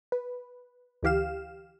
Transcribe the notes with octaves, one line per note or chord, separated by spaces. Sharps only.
B4
D2 E3 G4 F5 E7